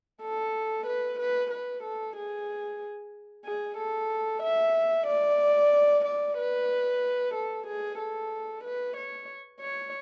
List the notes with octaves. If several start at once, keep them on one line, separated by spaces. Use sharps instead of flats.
A4
B4
B4
B4
A4
G#4
G#4
A4
E5
D5
D5
B4
A4
G#4
A4
B4
C#5
C#5